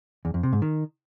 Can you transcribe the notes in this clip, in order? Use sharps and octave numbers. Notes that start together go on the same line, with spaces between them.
E2
F2
C3
G#2
D#3